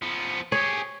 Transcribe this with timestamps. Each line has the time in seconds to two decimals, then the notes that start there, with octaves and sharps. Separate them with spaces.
0.02 F3 B3
0.52 G4 G#4 C#5